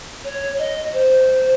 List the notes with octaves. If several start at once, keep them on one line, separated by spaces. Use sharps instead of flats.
C#5
D#5
C5